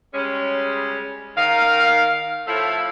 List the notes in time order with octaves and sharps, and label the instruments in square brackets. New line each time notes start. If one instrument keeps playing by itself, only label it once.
[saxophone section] C#3 G3 G#3 C#4
D#3 F5
A2 F3 A3 E4 A4 F5